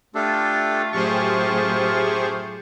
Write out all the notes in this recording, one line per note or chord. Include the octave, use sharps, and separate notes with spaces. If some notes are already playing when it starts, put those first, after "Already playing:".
A3 D4 F4 G4 A4
F#2 A2 G4 G#4 C5 C#6